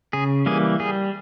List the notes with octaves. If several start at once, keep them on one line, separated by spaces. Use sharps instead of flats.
C#3 G#4
E3 G3 A#3 G#4
G3 G#4